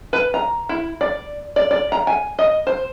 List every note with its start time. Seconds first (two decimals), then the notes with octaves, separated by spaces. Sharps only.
0.13 B4
0.34 A#5
0.69 E4
1.01 D5
1.56 D5
1.71 D5
1.92 A#5
2.07 G#5
2.39 D#5
2.67 C5